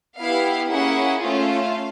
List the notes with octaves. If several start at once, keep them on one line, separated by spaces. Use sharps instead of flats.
B3 E4 G4 F5
A#3 C#4 E4 G#4 F#5
A3 C#4 F4 F5